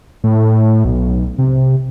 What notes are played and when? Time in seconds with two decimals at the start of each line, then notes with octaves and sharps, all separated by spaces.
0.24 A2
0.85 B1
1.39 C3